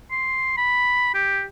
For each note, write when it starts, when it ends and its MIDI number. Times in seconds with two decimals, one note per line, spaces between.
0.11 0.54 84
0.57 1.12 83
1.14 1.45 67